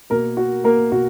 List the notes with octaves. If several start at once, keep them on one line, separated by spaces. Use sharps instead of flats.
B2 A#3 A#4
F#4
A#3 A#4
B2 A#3 F#4